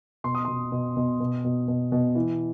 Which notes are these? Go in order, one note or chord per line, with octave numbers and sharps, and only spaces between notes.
B2 C6
D#6
B2 C6
B2
B2
B2
B2
B2
B2
E3